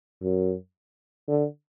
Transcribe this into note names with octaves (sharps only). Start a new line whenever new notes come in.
F#2
D3